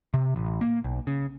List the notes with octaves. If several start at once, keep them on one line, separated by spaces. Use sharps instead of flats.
C3
A1
A#3
B1
C#3